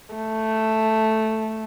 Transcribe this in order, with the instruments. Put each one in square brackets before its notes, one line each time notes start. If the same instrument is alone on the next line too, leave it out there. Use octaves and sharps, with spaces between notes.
[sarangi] A3